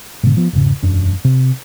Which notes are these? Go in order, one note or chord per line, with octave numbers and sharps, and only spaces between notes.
G#2 B2 D3
F3 B3
E1 G#2 C#3
E1 F#2 D4
C3